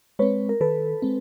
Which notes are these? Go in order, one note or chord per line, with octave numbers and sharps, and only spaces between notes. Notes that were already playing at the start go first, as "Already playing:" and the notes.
G#3 C4 B4 C#5
A#4
D#3 A4 B4
G#3 C4